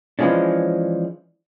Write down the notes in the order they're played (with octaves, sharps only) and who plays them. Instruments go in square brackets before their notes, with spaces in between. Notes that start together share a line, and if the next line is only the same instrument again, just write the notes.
[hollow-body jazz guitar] E3 F3 G#3 C#4 D4